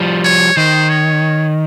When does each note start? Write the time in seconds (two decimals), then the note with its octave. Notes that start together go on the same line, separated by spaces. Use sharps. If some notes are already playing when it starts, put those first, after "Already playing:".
Already playing: F3 G3
0.24 C#5
0.57 D#3 C5
0.89 C#5